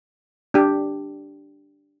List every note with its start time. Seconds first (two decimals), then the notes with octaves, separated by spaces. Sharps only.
0.54 D4 G4